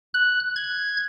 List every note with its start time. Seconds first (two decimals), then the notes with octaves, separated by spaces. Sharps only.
0.14 F#6
0.56 G#6